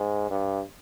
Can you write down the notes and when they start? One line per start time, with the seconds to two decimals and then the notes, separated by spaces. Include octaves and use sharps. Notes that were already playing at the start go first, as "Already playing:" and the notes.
Already playing: G#2
0.30 G2